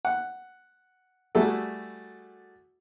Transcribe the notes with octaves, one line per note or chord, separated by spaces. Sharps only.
F#5
G3 A3 E4 F#4 G#4 A4